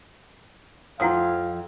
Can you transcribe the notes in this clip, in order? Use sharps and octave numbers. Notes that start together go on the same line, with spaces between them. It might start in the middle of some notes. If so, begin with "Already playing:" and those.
F2 F3 E4 F5 F#5 D#6